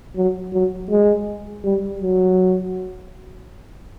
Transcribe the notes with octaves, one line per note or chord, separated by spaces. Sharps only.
F#3
F#3
G#3
G3
F#3